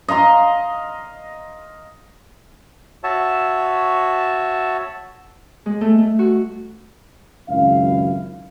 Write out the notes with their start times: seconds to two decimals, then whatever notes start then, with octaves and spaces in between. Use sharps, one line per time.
0.08 D#5 F5 A#5 C6
3.03 F#4 C#5 E5 A5
5.66 G#3
5.81 A3
5.98 A3
6.19 F#4
7.48 G#1 C#2 F#2 E4 F5